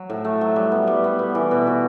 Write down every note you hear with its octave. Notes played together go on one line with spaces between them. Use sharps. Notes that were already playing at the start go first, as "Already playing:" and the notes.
Already playing: F#3
A2
A3
F#3
G3
B3
G3
B3
B3
E3
B2
F#4